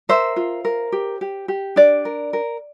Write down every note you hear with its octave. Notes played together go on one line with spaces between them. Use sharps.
A#4 C5 E5
F4
A#4
G4
G4
G4
D4 D5
A#4
A#4